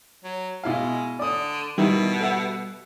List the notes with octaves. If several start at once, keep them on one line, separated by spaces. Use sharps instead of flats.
F#3
B2 G#3 E4 F5
D3 D5 D#6
B2 D#3 G3 E4
A4 E5 F#5